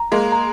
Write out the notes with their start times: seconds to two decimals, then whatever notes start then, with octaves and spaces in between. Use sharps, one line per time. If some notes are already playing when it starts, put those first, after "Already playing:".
Already playing: A#5
0.12 G#3 A#3
0.32 A#5